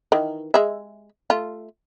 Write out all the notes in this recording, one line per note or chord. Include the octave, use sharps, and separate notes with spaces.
D#3 E3
G#3 E5
A3 F4